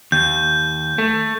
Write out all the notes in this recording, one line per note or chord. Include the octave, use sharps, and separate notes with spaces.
D#2 G6
A3